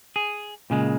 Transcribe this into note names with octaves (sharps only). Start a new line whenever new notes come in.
G#4
A#2 C#3 G#3